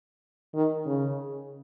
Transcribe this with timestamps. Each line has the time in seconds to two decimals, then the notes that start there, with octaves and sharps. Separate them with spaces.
0.55 D#3
0.86 C#3